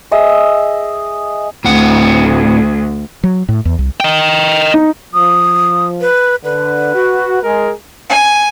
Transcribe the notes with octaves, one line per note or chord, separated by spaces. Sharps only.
G#4 D#5 E5
D2 A2 C4 F#5
F#3
A2
E2
C2
D#5 G5
D#4
F3 D#6
B4
D3 B4
F#4
G#3 G#4 A#4
G#5